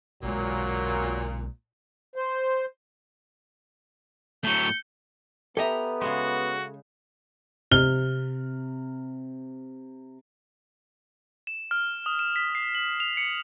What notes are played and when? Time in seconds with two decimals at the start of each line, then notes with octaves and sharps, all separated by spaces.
0.23 B1 A#2 F#3 G#3
2.16 C5
4.44 A2 F#3 G6 C#7
5.57 B3 G4 A4 D#5 E5 A#5
6.01 C#3 G#3 F#4
7.71 C3 F6 G7
11.47 E7
11.71 F6
12.06 D#6
12.19 E7
12.36 B6
12.55 C7
12.75 F#7
13.00 F7
13.17 C#7